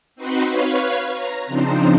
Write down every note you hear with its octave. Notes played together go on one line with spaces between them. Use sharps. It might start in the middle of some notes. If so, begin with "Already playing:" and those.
C4 D#4 F#4 B4 C5
B4 C#5 F5 C#6
A#5
C#3 F3 C4 D4 D#4 C5